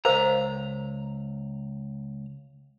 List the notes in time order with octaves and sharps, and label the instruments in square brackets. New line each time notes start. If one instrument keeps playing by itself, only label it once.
[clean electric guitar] C#2 A#5 [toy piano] A#4 C5 F5